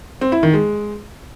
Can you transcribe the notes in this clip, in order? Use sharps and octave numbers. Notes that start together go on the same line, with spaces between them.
C4
E4
D#3
G#3